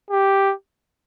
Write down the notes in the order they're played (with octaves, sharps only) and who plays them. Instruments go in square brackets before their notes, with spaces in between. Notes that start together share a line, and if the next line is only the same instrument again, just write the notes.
[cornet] G4